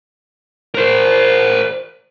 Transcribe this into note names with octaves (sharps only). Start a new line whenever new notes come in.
A#4 C5